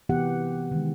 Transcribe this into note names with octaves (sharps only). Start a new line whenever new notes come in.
C3 E3 B3 G4 F#5
D#3 G#3